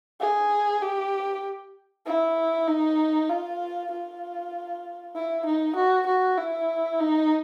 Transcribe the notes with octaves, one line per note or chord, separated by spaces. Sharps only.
G#4
G4
E4
D#4
F4
F4
E4
D#4
F#4
F#4
E4
D#4